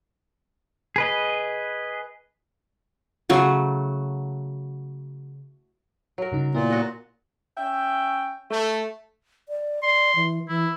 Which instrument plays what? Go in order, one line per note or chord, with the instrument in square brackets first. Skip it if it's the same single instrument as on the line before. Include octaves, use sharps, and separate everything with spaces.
[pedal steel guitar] G#4 B4 D#5
[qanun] C#3 F#3 A3
[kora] F#3 A#4
[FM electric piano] G2 C#3 D#4
[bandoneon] A#2 [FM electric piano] B3 E4
[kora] F#4 D#5
[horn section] C#4 E5 G5
A3
[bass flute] D5
[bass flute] D5 [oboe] C6
[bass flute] E3
[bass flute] E3 [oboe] E4